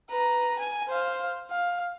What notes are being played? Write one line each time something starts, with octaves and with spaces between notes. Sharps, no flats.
B4 A#5
G#5
C5 F5
F5